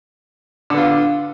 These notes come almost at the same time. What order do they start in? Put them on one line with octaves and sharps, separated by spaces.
D3 B3 F4